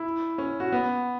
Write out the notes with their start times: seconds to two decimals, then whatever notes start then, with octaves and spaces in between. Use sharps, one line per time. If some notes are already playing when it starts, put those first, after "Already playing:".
Already playing: E4
0.38 C#4
0.60 F#4
0.72 B3